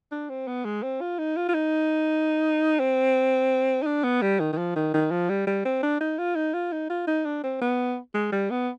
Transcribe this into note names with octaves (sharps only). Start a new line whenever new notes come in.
D4
C4
B3
G#3
C4
F4
D#4
F4
F4
D#4
C4
D#4
D4
B3
G3
D#3
D#3
F3
D#3
D#3
F3
G3
G3
C4
D4
D#4
F4
D#4
F4
D#4
F4
D#4
D4
C4
B3
G#3
G3
B3